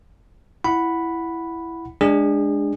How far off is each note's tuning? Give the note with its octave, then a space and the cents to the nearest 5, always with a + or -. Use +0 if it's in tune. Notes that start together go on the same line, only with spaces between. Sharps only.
E4 +10 F#5 +0 B5 +0
G#3 +0 D4 +0 G#4 -35